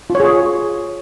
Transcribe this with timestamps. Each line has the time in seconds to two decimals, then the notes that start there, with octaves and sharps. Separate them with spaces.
0.10 F4
0.15 C#5
0.20 G#4
0.25 C#5